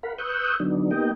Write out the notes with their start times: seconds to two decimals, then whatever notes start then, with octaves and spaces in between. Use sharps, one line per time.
0.03 A#4 F5 F#5 B5
0.18 B4 C#6 D#6 E6 F#6 G6
0.60 D3 F#3 B3 D4 D#4
0.91 A#3 B3 D#4 G4 D#5 G5